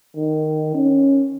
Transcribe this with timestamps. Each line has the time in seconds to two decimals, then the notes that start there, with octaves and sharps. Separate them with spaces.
0.16 D#3
0.75 C#4